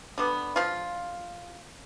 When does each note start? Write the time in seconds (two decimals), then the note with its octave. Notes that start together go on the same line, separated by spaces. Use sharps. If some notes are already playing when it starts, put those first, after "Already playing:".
0.18 D3 G3 B3
0.56 F3 F4